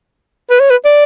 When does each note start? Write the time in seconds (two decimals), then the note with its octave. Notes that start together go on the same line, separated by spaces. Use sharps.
0.50 B4
0.60 C#5
0.71 B4
0.85 D5